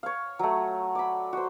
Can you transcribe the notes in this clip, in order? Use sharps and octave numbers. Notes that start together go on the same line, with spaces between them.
C#5 F5
F#3 A3
D5 B5
F#4 C5